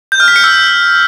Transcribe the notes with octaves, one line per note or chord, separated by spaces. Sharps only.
G6
F6
B6
C#7
E6